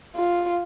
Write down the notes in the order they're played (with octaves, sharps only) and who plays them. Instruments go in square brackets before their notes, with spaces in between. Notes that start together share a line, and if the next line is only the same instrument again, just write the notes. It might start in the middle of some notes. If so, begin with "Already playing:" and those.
[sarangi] F4